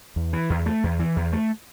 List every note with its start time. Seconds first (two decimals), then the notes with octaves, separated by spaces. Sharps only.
0.16 E2
0.33 E3
0.50 E2
0.66 A3
0.84 E2
0.99 E3
1.16 E2
1.33 A3